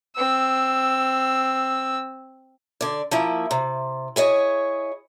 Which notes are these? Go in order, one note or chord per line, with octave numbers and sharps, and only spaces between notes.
C4 E6
D3 D5
F3 A#3 E4
C3
E4 G#4 C#5 D#5